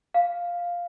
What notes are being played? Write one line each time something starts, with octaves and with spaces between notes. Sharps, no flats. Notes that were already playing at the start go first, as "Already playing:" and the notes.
F5